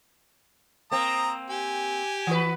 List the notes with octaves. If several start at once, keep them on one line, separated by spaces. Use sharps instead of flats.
A#3 C4 A#5 D#6
G4 G#5
E3 F#4 B4